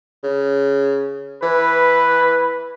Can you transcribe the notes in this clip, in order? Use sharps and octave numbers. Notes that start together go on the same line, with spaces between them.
C#3
E3 B4